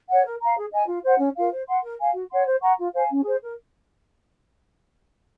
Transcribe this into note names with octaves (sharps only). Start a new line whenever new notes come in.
C#5 F#5
A#4
F5 A#5
G#4
D#5 G#5
F4
C5 F#5
C#4
F4 A#4 F5
C5
F#5 C6
A#4
F5 G#5
F#4
C#5 F#5 C6
C5
F#5 A#5 C#6
F4
C5 F5 G#5
C#4
G#4 C5
A#4